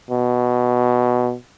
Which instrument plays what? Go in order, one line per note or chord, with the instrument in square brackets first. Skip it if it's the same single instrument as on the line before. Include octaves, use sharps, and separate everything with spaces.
[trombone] B2